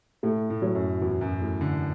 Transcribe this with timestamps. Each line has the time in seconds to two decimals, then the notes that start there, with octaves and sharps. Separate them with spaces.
0.23 A2 A3
0.50 A2
0.62 F#3
0.75 F#2
1.01 E2 F#4
1.21 F#2
1.41 A2
1.61 D3